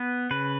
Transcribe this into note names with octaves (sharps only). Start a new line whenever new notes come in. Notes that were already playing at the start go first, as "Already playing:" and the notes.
Already playing: B3 B4
C#3 B4